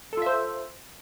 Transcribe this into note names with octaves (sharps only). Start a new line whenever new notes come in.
F4 A4 C5 E5